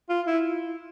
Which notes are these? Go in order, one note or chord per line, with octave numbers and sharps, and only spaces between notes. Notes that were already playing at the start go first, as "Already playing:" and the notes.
F4
E4